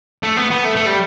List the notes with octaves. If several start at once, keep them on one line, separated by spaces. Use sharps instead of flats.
A3
B3
B3
A3
A3
G3